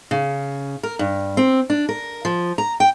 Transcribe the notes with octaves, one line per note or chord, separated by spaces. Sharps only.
C#3
A#4
G2
C4
D4
A#4
F3
A#5
G5